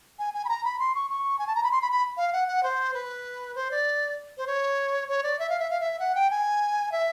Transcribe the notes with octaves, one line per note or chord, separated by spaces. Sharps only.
G#5
G#5
B5
A#5
B5
C6
C#6
C#6
G#5
A5
A#5
B5
C6
B5
B5
F5
F#5
F#5
C5
B4
C5
D5
C5
C#5
C#5
D5
E5
F5
E5
F5
E5
F#5
G5
G#5
E5